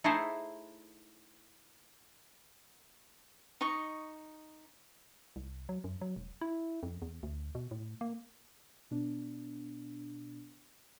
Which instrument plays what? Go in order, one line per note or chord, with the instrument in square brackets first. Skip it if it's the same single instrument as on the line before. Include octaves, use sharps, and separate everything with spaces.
[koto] A3 D#4 E4 G#4 A4 C5
[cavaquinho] D#4 D#5 C#6
[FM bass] C2
F#3
F#2
F#3
E1
E4
F2
E2
D2
B2
A2
A#3
[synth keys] B2 B3 D4